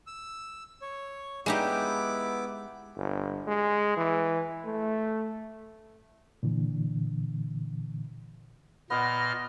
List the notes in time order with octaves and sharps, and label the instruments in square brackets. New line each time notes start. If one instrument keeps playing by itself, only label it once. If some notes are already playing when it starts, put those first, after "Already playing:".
[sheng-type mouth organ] E6
C#5
[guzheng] G#3 D#4 G4 [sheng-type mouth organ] B3 E4 D6
[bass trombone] G1
G#3
E3
A3
[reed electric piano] A#2 D3 E3
[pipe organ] A#2 D#5 F6 [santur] B3 D6